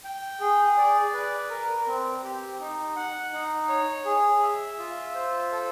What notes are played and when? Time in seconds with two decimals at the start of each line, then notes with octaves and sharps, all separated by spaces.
0.04 G5
0.40 G#4
0.78 D5
1.14 B4
1.50 A#4
1.87 C4
2.23 G4
2.60 D#4
2.96 F#5
3.33 D#4
3.68 C#5
4.05 G#4
4.42 E5
4.78 F4
5.15 C5
5.52 A4